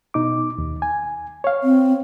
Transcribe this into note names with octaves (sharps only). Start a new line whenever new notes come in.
B2 D#4 D6
D#2
G#5
C#5 F5
C4